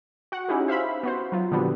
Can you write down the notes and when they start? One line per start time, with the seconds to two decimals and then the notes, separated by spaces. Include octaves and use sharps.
0.32 F#4 F#5
0.48 C#4 D#4 E4 G4 G#4
0.68 C5 E5 F5 B5
1.03 B3 F#4 C5
1.32 F#3 F4
1.51 A#2 D3 F3 G3 B3 F#4